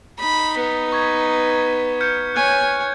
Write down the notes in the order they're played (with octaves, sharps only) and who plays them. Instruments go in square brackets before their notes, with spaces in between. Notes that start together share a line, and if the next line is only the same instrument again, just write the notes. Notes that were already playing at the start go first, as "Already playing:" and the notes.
[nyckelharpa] D#4 [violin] B5
[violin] B3 [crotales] B6
[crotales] C#6 G#6 B6
C#6 G#6
F6 G6 C#7
[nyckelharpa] C#5 G#5 [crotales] F#6 G#6 C#7